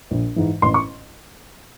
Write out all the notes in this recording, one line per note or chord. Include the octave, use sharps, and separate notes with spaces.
A#1
G#2 E3
A1 C6
C#6